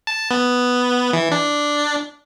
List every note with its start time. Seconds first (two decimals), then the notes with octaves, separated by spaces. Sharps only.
0.07 A5
0.31 B3
1.13 E3
1.31 D4